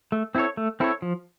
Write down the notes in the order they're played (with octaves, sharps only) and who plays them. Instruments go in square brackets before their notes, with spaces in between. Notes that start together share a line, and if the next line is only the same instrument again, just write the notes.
[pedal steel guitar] A3
C4 E4 A4 C#5
A3
C4 E4 A4 C#5
F3